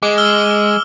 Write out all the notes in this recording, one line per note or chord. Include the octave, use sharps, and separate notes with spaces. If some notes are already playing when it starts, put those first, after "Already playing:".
G#3 D6
E6 F6 G7